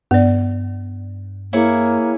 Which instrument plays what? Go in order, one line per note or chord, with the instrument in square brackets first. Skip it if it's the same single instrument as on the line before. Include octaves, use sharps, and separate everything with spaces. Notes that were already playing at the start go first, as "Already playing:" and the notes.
[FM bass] G2 [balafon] B3 D5
[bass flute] A#3 [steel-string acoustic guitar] E4 G#4 C#5